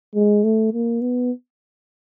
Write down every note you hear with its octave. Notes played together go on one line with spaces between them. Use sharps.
G#3
A3
A#3
B3